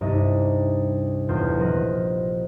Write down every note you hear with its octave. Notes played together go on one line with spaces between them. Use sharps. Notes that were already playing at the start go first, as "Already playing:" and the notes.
C2 G2 D4 D#4 D#5 E5
E1 A1 E2 F4 G6
A#1 F3 B4 D#5 A#6